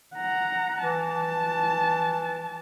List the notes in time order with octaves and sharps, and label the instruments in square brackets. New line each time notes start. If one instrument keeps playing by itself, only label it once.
[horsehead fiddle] F#5 A#5
[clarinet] E3 [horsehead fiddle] A5